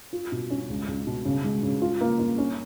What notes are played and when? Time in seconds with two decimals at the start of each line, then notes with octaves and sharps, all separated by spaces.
0.13 F4
0.32 B2
0.50 C#4
0.70 C#2
0.88 C#2
1.07 B2
1.25 C#3
1.44 G#3
1.63 C#3
1.82 F4
2.01 A#3
2.19 A#3
2.38 C#4